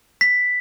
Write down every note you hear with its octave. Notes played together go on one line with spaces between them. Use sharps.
B6